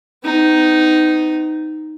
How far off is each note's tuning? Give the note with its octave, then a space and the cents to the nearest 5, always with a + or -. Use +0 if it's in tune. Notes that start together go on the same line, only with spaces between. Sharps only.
B3 +45 D#4 +0